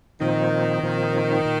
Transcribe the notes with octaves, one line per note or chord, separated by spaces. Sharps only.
A#2 D#3 F3 C4 D#4
A#2 F3 C4 D#4
A#2